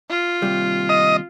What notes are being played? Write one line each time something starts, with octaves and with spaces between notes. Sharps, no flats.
F4
D#2 C3 G3
D#5